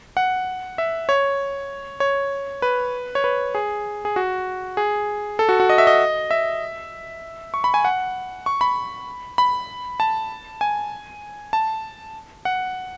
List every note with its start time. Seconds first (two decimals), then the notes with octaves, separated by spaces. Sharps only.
0.17 F#5
0.78 E5
1.09 C#5
2.00 C#5
2.62 B4
3.15 C#5
3.24 B4
3.55 G#4
4.05 G#4
4.16 F#4
4.77 G#4
5.39 A4
5.49 F#4
5.60 F#4
5.69 D#5
5.78 E5
5.87 D#5
6.31 E5
7.54 C#6
7.64 B5
7.74 G#5
7.85 F#5
8.46 C#6
8.61 B5
9.38 B5
10.00 A5
10.61 G#5
11.53 A5
12.45 F#5